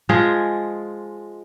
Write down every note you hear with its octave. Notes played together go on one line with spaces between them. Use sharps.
F3 G#3 F4 G#4